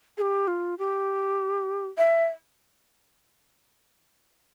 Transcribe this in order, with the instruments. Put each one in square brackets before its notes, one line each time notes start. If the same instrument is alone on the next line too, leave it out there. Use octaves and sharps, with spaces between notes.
[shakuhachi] G#4
G4
F4
G4
E5